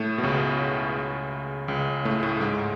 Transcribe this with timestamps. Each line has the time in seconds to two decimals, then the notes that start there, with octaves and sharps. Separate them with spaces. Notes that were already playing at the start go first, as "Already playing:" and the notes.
Already playing: A2 A3
0.18 B2
0.23 C#2 C#3
1.68 C#2 C#3
2.05 A2 A3
2.23 A2 A3
2.40 G#2 G#3